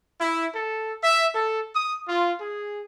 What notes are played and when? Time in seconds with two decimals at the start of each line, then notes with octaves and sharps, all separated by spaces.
0.19 E4
0.55 A4
1.02 E5
1.35 A4
1.75 D#6
2.08 F4
2.40 G#4